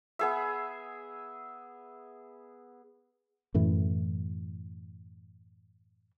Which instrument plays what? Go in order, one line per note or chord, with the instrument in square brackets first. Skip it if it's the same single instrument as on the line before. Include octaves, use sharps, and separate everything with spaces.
[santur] B3 G#4 E5
[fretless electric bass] F#2 A2 E3